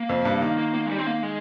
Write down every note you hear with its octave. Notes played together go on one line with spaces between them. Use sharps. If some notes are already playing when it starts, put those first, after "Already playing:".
Already playing: A#3
F2
G2
D#3
A#3
A#3
G#3
G3
C4
A#3
G#3